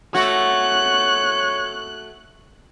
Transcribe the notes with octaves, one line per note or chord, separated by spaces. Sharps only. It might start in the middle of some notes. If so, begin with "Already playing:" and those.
A3 F#4 C#5 F#6